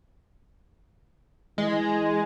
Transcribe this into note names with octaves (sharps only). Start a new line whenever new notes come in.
E3 G#3